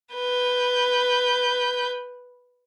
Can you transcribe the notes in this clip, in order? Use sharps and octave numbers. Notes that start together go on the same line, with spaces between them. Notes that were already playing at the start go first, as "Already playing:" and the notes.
B4 G6